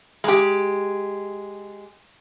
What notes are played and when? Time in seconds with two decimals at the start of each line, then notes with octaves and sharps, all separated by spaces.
0.24 G#3 G4